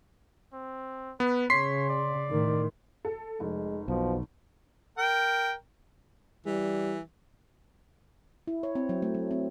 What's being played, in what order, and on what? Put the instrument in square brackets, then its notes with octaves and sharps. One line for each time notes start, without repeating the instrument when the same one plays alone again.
[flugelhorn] C4
[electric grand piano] B3 [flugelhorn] B4
[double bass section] C#3 [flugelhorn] C#5 [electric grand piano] C6 B6 C7
[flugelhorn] D5
[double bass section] A2 D#3
[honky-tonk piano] A4
[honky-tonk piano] F1 [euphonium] G#3
[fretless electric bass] B1 [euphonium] B2 [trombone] F3
[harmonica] A#4 G5
[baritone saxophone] E3 [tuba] G3
[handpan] E4
C#5
C4
F#3
A3
F#3
C4